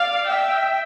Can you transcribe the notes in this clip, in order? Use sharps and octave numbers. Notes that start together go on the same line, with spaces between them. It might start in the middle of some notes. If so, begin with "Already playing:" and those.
Already playing: D5 F5
E5 G5